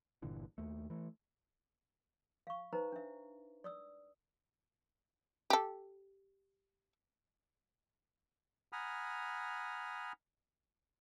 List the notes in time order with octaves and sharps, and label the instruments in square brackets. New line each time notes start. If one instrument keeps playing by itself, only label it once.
[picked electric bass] G1 A#2 D3 E3
D#2 A3
E3 A3
[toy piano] F5 C#6
D#4 B4 C5 A#5
D4 E5
D5 D#6 E6
[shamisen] G4 A4
[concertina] F#5 G#5 A#5 B5 D#6 F6